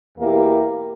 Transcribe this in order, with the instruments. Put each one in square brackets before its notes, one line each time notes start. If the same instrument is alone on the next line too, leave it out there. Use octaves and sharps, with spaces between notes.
[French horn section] E2 B2 A#3 E4 G4